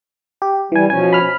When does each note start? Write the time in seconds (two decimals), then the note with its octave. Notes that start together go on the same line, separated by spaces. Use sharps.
0.42 G4
0.72 E3 G3 G#5
0.90 B2 F3 C#4 G#5
1.13 B5 F6